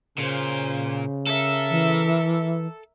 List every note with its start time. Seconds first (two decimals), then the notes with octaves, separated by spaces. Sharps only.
0.18 A#2 C#3 C#4 C5
1.27 A4 A#4 E5
1.70 E3